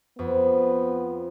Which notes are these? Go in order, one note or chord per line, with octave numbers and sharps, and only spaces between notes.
F2 B3